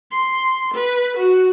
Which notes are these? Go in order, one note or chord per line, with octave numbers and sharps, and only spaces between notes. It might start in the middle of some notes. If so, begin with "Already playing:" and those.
C6
B4
F#4